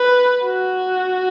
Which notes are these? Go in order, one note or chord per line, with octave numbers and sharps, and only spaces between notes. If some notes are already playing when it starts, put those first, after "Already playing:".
Already playing: B4
F#4